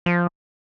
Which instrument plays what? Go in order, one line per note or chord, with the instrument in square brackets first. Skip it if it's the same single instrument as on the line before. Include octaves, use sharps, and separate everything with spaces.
[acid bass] F3